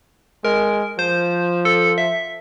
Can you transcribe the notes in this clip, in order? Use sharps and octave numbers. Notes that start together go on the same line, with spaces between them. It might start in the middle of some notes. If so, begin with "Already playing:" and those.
G#3 A#4
F3 C5
A4
E5